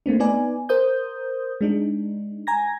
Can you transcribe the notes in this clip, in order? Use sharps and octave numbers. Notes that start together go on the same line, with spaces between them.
A3 A#3 C4 D4
B3 D#4 B4 D5 G#5
A#4 C5 D#6 G6
G#3 D4 D#4
G#5 A#5 G#6 A#6